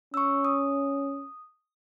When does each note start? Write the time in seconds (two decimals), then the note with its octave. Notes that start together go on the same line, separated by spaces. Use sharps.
0.14 C#4 C#6 E6
0.45 D#6